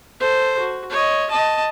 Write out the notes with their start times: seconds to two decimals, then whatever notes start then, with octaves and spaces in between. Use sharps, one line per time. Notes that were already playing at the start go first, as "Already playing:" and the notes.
0.20 A4 C5
0.58 F#4
0.90 C#5 D#5
1.30 D#5 A5